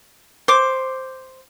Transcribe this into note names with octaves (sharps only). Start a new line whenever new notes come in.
C5 D6